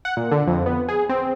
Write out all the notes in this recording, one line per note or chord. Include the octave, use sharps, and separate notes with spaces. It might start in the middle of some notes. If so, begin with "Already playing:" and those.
F#5
A#2
D3
F2
B3
G#4
C4